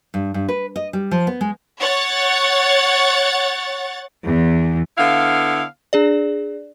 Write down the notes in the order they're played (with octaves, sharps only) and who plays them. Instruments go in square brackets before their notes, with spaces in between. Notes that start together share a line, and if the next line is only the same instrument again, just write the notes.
[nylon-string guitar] G2
G2
B4
D#5
G3
F3
B3
G#3
[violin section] C#5 F#5 A6
[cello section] E2
[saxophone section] D3 B3 E4 F5
[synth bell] D4 G#4 D5